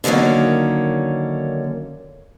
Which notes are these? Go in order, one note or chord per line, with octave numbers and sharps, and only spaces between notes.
D3 D#3 F#3 A#3 C#4